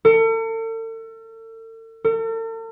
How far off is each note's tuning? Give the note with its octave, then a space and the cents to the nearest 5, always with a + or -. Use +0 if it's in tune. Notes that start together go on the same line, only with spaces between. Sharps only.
A4 +40
A4 +45